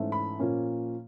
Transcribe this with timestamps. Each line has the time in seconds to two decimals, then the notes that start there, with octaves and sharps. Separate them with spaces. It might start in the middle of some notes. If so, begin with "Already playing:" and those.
Already playing: G#2 E3 A3 C#4
0.12 B5
0.39 A#2 F3 A#3 C#4